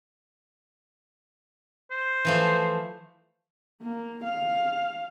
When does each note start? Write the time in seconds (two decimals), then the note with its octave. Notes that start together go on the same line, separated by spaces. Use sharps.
1.91 C5
2.25 E3 F3 A3
3.82 A#3
4.24 F5